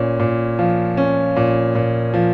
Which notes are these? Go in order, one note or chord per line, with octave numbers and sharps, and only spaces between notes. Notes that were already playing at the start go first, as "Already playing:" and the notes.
Already playing: A#2 C#4
A#2
F3
C#4
A#2
A#2
F3